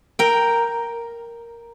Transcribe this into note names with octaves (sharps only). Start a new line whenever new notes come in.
A#4 G5